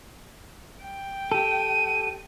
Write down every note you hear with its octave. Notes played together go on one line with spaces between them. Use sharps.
G5
G4 A4 D#7